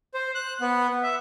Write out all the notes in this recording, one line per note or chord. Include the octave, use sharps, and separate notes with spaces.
C5
F#6
B3
E5